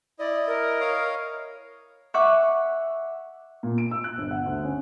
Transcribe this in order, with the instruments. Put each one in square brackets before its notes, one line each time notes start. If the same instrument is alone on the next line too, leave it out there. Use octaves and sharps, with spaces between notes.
[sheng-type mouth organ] E4 D#5 [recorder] D5
[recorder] A#4
[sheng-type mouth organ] C#5 D#5 F5
[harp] E5 F#5 C#6 D6 F#6
[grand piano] A#2
D7
E6
F#6
G1
F#5
D2
C#4